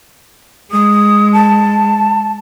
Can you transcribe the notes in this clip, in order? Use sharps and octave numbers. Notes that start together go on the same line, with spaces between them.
G#3 D#6
A5